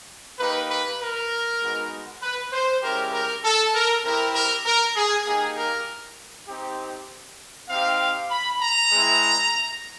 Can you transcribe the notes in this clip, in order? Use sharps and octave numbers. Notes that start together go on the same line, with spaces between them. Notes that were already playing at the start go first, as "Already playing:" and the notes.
A#3 D#4 G4 B4
B4
A#4
G#3 B3 D#4 F#4
B4
C5
G#3 C#4 E4 G4 A#4
A#4
A4
A#4
C4 E4 G4 A#4
A#4
A#4
G#4
A#3 D#4 G4 G#4
A#4
C4 D#4 G4
C4 D#4 G4 F5
B5
A#5
G#3 C4 E4